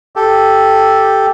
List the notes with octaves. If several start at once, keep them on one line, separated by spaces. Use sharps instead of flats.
G4 A4